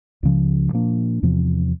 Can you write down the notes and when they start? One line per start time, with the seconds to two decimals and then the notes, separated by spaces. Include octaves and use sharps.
0.23 C#2 C#3 F3
0.73 A#2 F3 A#3 D4
1.23 E2 C3 F3